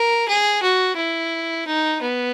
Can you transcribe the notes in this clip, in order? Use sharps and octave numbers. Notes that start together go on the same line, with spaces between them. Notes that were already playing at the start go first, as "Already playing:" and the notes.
Already playing: A#4
G#4
F#4
E4
D#4
B3